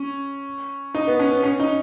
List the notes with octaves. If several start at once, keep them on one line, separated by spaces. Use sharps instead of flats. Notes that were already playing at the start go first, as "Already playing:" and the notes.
Already playing: C#4
D#4
B3
C#4
B3
C#4
D#4